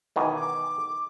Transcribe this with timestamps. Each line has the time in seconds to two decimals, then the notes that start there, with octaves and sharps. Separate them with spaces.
0.16 B2 D#3 E3 G#5
0.36 D6